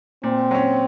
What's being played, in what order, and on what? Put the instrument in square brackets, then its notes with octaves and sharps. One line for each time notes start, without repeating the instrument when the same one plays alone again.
[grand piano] A#2 [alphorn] C4
[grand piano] F#3 C#4